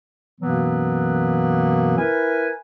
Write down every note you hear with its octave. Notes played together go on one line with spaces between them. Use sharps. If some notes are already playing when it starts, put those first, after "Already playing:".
F#2 B2 E3 F#3 A#3 B3
E4 A#4 B4 G#5